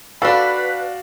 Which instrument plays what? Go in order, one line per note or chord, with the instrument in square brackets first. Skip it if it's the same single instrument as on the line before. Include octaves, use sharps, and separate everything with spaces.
[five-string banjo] D4 A4 [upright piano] F#4 D5 F5 [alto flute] B4 [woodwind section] B5